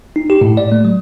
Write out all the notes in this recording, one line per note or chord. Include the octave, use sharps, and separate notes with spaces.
D#4
G4
A2
D5
A3
F#3